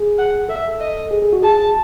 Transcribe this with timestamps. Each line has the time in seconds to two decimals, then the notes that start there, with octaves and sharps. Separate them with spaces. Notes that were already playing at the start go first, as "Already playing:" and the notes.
Already playing: G#4
0.18 F#5
0.49 A4 E5
0.80 D#5
1.11 G#4
1.22 G#4
1.33 F#4
1.42 G#4 A5